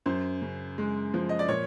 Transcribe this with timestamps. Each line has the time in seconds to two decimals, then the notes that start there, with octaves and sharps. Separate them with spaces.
0.06 F#2 C5
0.42 C#3
0.78 G#3
1.14 F3
1.29 D#5
1.39 D5
1.48 A#2 C#5